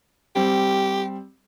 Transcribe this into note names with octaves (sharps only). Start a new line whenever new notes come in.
G3 C4 G4